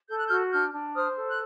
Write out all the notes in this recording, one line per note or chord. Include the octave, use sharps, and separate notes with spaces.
A4 G6
F#6
F#4 F6 G6
D4 F6 G6
D4
C5 D#6 F6
A4
F#6